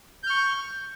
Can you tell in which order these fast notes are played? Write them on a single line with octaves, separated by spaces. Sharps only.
G6 F6 C#6